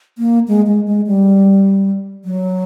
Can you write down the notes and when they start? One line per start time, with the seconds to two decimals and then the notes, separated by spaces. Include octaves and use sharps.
0.18 A#3
0.48 G#3
0.67 G#3
0.88 G#3
1.07 G3
2.25 F#3